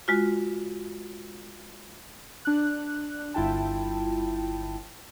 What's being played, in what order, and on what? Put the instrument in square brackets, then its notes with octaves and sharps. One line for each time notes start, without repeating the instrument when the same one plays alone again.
[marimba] G#3 F4 F#4
[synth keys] D4 F#6
G1 E4 F4 G5 A5